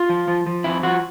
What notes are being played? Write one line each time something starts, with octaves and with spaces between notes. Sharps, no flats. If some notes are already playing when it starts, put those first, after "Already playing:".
Already playing: F4
F3
F3
F3
F2 E4
F3 F#4